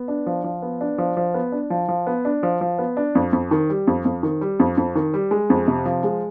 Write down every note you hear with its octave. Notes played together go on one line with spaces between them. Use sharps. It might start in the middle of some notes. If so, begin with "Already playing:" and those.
Already playing: B3
D4
F3
F3
B3
D4
F3
F3
B3
D4
F3
F3
B3
D4
F3
F3
B3
D4
F2
F2
D#3
G3
F2
F2
D#3
G3
F2
F2
D#3
G3
G#3
F2
C3
F3
G#3